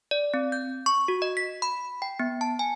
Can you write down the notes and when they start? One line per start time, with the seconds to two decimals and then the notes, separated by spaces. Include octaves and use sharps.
0.11 D5
0.34 C4
0.52 G6
0.86 C#6
1.08 F#4
1.22 D#5
1.37 B6
1.62 B5
2.02 G5
2.19 B3
2.41 A5
2.59 G#5